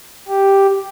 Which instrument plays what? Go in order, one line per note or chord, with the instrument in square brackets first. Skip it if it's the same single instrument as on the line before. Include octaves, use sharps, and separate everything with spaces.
[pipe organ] G4